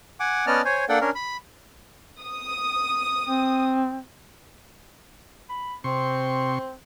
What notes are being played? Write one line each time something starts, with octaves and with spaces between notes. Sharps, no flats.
F#5 G#5 D6
B3 C#4 D5 D#5 A5 F6
C5 C#5 G#5
A#3 D4 A4 D5 F#5 G5
C#4 D4 A#4
B5
D#6
C4
B5
C3 C4 C6 C#6